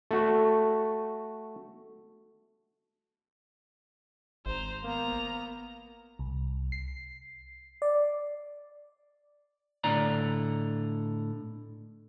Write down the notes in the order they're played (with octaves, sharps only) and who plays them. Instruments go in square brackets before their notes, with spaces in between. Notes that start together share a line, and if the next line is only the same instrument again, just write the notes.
[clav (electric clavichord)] A3 F#4
[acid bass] G#1 [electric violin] C5 A#5
[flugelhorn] A#3 [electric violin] B3 A#5
[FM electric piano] C2
C7
D5
[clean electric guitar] A2 D3 D5 A#5